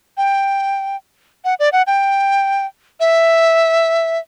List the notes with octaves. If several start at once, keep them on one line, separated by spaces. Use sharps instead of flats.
G5
F#5
D5
F#5
G5
E5